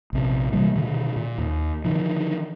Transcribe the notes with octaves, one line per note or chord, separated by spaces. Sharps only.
A#1 C3
C3 E3 G3 A#3
B2 D3 D#3
A#2
D#2
D3 D#3 F3